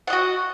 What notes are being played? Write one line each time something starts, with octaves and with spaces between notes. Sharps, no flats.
F#4 D#5 F#5